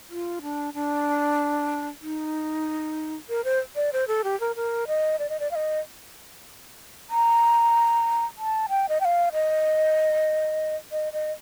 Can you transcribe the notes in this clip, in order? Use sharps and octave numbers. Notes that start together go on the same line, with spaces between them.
F4
D4
D4
D#4
A#4
C5
D5
C5
A4
G4
A#4
A#4
D#5
D5
D#5
D5
F5
D#5
A#5
A5
G5
D#5
G5
F5
D#5
D#5
D#5